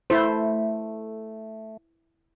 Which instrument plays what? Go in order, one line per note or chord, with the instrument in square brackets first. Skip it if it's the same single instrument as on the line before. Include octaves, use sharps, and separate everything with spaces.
[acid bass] A3 [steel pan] E4 C5